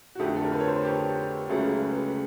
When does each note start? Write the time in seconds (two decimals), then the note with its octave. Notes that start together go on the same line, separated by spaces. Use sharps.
0.15 F#4
0.19 F2 D3 F3 A3 G4
0.36 A4
0.44 A#4
0.52 B4
0.60 C#5
0.68 C5
0.76 B4
0.85 G4
1.49 C#2 C#3 F#3 A3
1.82 B4